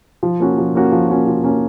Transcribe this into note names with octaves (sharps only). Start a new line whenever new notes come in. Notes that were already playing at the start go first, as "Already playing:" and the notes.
F3
A#3 C#4 F#4
F3
A#3 C#4 F#4
F3
A#3 C#4 F#4
F3
A#3 C#4 F#4